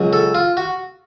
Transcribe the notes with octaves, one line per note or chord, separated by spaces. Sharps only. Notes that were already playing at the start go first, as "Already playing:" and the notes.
Already playing: C#2 C#3 F#3
A4
F4
F#4